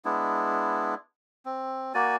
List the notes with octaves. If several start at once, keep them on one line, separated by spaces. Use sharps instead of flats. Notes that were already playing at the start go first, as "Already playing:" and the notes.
G#3 B3 D4 E4
C4
A#3 F#4 D5 G#5